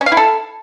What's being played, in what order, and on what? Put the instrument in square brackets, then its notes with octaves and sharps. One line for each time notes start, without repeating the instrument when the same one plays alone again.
[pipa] C#4
F5
E4
A4